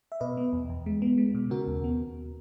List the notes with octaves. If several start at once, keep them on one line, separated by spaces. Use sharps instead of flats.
E5
B2 B4 D#5
B3
E2
E2
G#3
B3
G#3
B2
C#3 F#4 A#4
D#2
B3